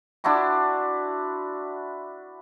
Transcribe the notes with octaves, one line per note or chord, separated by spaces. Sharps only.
D4 E4 F#4 C6